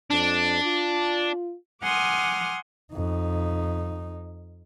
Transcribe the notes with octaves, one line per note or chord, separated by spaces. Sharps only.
F2 D4
F4
F#5 G#5 C6 D6 D#6 F6
F2 D#4